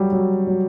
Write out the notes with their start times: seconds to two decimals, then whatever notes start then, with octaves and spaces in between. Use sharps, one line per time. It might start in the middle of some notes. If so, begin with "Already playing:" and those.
Already playing: F#3 G3
0.13 F#3
0.47 F#3